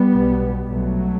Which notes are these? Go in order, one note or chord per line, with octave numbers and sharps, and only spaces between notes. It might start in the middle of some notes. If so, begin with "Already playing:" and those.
Already playing: G3 B3
B1 B2
B1 B2 F#3 A3